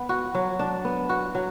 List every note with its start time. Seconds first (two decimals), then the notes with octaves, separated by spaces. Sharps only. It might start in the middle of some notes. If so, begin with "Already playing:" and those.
Already playing: B3
0.09 F#4
0.35 F#3
0.59 D4
0.85 B3
1.09 F#4
1.35 F#3